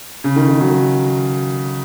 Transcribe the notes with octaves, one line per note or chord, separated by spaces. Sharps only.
C#3
D#3
D#3
F#3